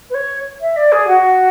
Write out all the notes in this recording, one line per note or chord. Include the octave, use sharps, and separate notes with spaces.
B4
C#5
E5
D5
G#4
F#4